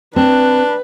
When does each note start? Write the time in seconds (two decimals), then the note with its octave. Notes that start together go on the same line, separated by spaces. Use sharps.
0.16 C4 D4 B4